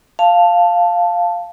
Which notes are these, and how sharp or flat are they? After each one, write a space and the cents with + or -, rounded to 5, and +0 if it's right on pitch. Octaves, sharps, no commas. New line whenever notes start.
F5 +0 A5 +0